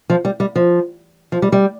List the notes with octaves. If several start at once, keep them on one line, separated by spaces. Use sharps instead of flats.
F3
G3
G3
F3
F3
G3
G3